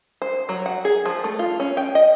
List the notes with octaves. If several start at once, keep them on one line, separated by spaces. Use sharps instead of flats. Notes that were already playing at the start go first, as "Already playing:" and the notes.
C5
F#3
F#5
G#4
F3
A3
F4
C#4
G5
D#5